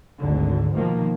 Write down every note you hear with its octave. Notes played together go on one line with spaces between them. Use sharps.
G#1 D2 D3
B2 D#3 F3 A#3